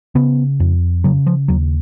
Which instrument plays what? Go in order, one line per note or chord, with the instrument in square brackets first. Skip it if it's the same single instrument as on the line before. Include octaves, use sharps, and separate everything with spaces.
[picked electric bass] C#3 B3
F2
C#3 F#3
F3
D#2 F#3